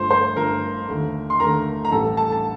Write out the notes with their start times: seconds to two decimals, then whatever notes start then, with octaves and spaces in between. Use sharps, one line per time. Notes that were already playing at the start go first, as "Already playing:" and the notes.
Already playing: G1 G2 F3 A3 C5 C6
0.10 C5 C6
0.36 G1 G2 F3 A3 A#4 A#5
0.88 D#2 D3 A3
1.30 C6
1.40 D#2 D3 A3 A#4 A#5
1.85 A#5
1.92 A1 A2 G3 A4 A5
2.17 A4 A5
2.32 A5